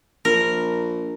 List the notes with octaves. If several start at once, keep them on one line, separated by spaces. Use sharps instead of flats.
A#1 A#4